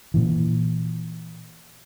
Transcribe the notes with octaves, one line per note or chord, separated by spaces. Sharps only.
A#2 E3